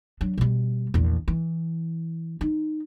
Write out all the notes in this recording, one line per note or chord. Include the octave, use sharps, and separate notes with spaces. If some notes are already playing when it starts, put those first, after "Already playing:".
F#3 D4
B2 G3
A#1 E2
E3
D#4